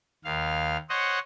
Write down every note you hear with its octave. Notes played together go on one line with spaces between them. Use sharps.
D#2 F5
C5 C#5 D#5 F#5